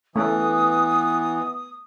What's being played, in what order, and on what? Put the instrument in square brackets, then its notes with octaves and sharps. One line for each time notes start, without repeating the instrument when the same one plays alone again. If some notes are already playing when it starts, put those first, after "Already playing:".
[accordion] E3 [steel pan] A3 C#4 A4 [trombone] B3 [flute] D#6